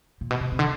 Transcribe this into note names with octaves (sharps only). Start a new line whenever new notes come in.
A#2
B2
C3
C3
D3